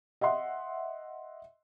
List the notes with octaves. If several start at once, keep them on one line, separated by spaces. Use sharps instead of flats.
D#5 E5 F#5 C6